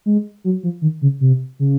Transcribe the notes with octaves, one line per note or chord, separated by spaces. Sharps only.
G#3
F#3
F3
D#3
C#3
C3
C#3